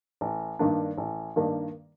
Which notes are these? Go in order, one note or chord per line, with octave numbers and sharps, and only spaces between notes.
A1
G2 D#3 A#3 D4
A1
G2 D#3 A#3 D4